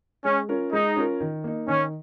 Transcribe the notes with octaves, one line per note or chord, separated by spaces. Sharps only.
G#3 C#4
C#4 F4 A#4
G#3 D#4
C#4 F4 A#4
D#3
A#3 D#4
D#3 C#4